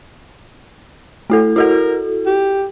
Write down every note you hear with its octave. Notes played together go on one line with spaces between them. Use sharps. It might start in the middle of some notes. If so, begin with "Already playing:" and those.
A3 E4 A4
E4 F#4 A4 A#4
G4